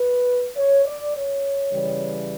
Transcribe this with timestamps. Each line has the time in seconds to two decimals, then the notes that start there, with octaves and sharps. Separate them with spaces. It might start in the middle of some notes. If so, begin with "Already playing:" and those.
Already playing: B4
0.57 C#5
0.86 D5
1.15 C#5
1.73 C#3 E3 G3